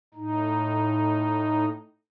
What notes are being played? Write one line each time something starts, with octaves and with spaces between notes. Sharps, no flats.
A2 D#4